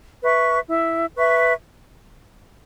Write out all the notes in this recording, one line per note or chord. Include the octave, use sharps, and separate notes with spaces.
B4 E5 C#6
E4
B4 E5 C#6